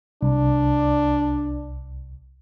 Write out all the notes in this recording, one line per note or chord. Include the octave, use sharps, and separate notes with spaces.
C2 D4